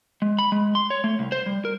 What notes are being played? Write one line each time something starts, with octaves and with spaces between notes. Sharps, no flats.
G#3
B5
G#3
C6
C#5
A3
C2
C5
G3
A#4